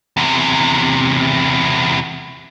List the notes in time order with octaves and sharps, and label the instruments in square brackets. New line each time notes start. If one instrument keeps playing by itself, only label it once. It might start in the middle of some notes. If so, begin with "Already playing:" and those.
[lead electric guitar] E2 C3